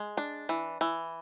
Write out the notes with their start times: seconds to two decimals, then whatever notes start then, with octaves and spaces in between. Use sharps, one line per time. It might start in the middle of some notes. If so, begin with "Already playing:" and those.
Already playing: G#3
0.17 D4
0.49 E3
0.81 E3